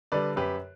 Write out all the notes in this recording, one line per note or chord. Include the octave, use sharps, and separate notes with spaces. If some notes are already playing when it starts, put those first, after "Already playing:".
D3 G3 B4 D5
F#2 G4 B4